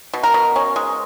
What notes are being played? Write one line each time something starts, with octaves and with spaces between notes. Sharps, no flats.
B2
A#4
B2
C#4
G#3